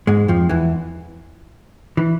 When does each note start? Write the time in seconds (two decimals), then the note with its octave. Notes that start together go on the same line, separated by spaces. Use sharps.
0.07 G#2 G#3
0.28 F2 F3
0.49 E2 E3
1.97 E3